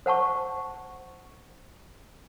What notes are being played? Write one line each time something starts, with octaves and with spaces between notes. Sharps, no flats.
C5 F#5 A5 C#6